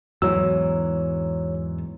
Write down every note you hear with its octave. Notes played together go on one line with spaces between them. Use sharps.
E2 G#2 E3 F#3 C#5 E6